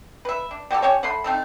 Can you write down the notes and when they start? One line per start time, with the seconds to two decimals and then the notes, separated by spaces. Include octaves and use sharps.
0.25 B4 E5
0.51 D4
0.71 G3 F#4 G4 A4
0.82 C#4 G4 C#5
1.03 A3 F#5 B5 C6
1.24 A3 C4 D#4 A4